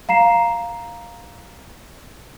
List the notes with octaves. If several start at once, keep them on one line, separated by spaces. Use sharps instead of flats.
F5 A#5 C7 E7